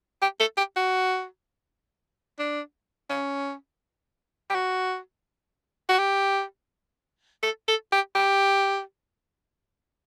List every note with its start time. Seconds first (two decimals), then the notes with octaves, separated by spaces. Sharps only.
0.22 G4
0.40 A4
0.57 G4
0.76 F#4
2.39 D4
3.10 C#4
4.50 G4
4.54 F#4
5.89 F#4
5.99 G4
7.43 A4
7.68 A4
7.92 G4
8.15 G4